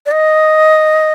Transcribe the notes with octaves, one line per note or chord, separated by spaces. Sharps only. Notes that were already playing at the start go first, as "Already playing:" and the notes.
D5
D#5